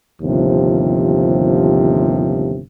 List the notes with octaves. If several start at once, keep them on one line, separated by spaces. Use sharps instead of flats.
G1 D#2 C3 F3